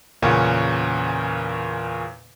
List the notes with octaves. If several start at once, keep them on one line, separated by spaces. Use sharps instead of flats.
E2 A#2 C#3 C#4 F#5